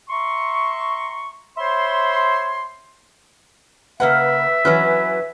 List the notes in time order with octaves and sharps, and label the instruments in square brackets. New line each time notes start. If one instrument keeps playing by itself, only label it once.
[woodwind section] E5 A#5 C6 C#6
C5 C#5 E5 B5 C6
[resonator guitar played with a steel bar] C#3 A#3 F#5 [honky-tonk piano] B4 [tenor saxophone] E5
[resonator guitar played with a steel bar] E3 F#3 C#4 [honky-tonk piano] B4